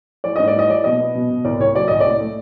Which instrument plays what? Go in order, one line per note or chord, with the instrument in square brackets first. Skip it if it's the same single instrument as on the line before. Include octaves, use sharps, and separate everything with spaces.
[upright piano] E3 D5
G#2 D#5
D5
E3 D#5
E3 D5
B2 D#5
B3
B2
B2
C2 D5
C2 C#5
F#3 D5
C2 D#5
D5
A2
A3